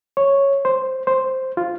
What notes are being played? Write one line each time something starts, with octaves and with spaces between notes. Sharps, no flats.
C#5
C5
C5
F4